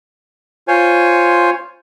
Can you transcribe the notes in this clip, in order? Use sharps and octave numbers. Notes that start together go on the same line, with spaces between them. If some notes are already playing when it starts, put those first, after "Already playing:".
F4 C5 C#5 G#5